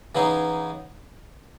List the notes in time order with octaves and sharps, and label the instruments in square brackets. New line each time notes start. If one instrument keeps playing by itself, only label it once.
[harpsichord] C#3 E3 B3 D#4 G#4